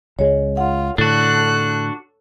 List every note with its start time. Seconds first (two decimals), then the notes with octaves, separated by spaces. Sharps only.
0.19 C#2 G#3 C#5
0.57 F4 F#5
0.98 A2 D3 D4 F#4 A4 F#6